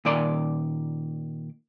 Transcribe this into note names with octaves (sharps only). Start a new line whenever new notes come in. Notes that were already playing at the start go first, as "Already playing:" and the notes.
A#2 D#3 D5 C6